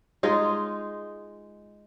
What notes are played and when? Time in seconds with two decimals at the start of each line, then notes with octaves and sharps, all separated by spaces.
0.23 G#3 D#4 F4 G#4